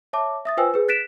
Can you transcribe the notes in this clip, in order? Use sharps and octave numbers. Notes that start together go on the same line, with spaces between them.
C#5 E5 A5 D6
E5 D#6 A6
F4 B4 C5 G5 G#5 E6
G#4 B4
F#6 A6 B6 D7 E7